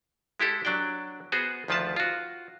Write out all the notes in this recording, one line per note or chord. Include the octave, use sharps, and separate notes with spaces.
G#3 E4 G4 A4
F#3 D4 D5 G5
B3 F#4 G#4 C5
D2 D#3 F3 F4 B4 A5
F4 F#4